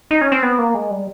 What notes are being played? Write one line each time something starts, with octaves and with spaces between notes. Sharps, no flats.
D#4
C#4
C4
B3
A#3
G#3
G3